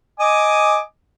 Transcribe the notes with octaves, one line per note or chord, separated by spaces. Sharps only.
D#5 G#5 D6